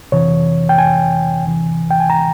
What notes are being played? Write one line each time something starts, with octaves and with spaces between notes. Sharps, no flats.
F2 C3 E3 C#5
G5
G#5
E2 C3 E3
G5
G#5
A#5